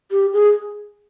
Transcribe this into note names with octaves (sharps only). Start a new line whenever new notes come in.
G4
G#4